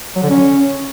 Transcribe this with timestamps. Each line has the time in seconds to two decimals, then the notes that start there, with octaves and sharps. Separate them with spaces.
0.16 F#3
0.23 D3
0.30 C#4